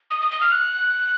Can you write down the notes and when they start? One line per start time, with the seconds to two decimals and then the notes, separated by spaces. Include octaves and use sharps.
0.11 D#6
0.21 D#6
0.31 D#6
0.41 F6
0.52 F#6